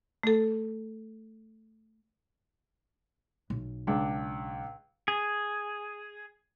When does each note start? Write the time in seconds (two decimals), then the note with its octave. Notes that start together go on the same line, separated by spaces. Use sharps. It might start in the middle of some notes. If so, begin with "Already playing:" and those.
0.23 A3 A4
3.50 B1
3.87 C#2 D4
5.08 G#4